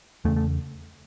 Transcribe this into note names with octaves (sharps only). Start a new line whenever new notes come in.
E2 C#3 A3
A3